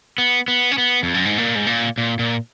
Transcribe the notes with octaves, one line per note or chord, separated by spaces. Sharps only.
B3
B3
C#4
B3
F2
F#2
G#2
A#2
G#2
A#2
A#2
A#2